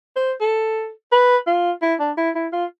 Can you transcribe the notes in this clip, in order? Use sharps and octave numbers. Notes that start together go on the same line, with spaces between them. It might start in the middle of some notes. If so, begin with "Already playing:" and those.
C5
A4
B4
F4
E4
D4
E4
E4
F4